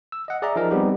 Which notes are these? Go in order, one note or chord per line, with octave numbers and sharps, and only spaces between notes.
E6
D#5 F#5
G#4 D5 E5 A#5
F3 D#4 G#4 A#4 D#5
G3 B3 C4 D#4 G4